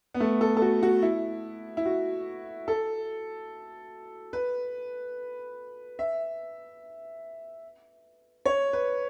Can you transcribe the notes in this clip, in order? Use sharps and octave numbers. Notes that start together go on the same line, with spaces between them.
B3
A3
A4
A4
F#4
F#4
E4
E4
F#4
A4
B4
E5
C#5
B4